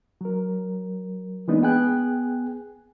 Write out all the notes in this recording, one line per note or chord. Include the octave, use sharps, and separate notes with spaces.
F#3 A#4
E3 G#3 A#3 B3 D4 D#4
B3 G#4 G5 G#5 F#6